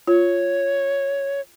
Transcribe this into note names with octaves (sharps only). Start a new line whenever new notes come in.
F4 C#5